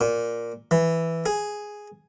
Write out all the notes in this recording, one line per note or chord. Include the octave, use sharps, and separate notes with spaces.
A#2
E3
G#4